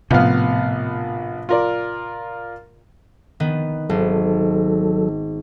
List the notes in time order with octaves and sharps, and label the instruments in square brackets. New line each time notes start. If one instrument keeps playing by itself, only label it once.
[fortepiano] A#1 B3 F5 [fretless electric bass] A2 C3
[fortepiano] F4 A#4 D5
[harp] D#3 B3
[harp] G#1 [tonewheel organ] F#3 A4